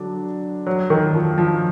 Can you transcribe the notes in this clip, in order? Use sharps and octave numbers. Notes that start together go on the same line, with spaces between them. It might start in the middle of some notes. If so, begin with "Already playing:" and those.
Already playing: D3 F#3 D4
F#3
D#3
F3
F3